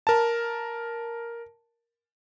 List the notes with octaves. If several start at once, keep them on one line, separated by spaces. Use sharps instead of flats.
A#4 A5